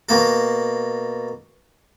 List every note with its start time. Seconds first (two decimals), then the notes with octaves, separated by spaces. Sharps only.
0.09 B2 A#3 A4